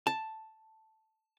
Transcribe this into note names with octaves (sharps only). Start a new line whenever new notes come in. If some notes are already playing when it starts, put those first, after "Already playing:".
A5